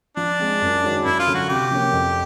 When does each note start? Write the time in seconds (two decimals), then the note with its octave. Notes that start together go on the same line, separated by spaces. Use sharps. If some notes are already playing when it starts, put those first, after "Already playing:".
0.17 F3 D4
0.39 G#3 C4
0.61 F#2
0.83 D#3 G#3 C#4 F#4
1.05 F#2 E4
1.19 F4
1.27 D3 F#3
1.34 F#4
1.49 C3 G4
1.71 F3 A#3 C#4
1.93 F2